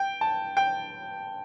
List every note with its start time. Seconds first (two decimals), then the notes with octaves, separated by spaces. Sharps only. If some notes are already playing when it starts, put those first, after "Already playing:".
Already playing: G5
0.21 A5
0.57 G5